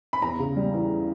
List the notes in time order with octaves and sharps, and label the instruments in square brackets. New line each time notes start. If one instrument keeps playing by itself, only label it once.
[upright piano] B5
E2 A#5
C#3
G3
E3